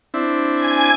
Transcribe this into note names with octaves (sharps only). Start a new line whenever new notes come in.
C4 D4 E4
G#5 G#6